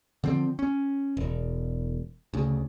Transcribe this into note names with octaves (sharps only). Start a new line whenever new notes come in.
D3 F3 C4
C#4
E1
D2 C#3